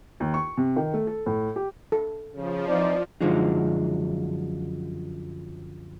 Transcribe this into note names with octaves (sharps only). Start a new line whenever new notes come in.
D#2
C#6
C3
D#3
A3
A4
A2
G4
A4
C#3 F3
E3 C4 D#4 D5
F#2 D3 F3 F#3 G#3 D#4